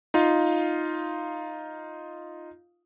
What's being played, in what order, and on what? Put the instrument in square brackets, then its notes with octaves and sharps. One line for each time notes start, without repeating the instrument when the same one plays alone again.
[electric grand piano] D#4 F4 F5